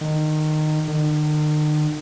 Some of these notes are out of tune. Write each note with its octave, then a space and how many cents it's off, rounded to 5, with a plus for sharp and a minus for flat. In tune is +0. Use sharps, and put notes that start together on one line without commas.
D#3 -20
D#3 -45